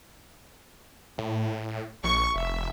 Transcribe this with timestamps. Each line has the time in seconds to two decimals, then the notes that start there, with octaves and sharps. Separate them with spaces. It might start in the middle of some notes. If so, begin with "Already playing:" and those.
1.18 A2
2.04 A#1 C#6
2.35 F1 E5